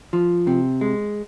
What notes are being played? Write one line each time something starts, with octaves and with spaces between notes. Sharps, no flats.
F3
C3
G#3